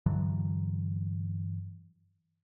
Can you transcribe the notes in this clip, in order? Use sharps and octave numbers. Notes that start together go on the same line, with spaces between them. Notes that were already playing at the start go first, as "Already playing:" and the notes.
G2 D3 E3 F#3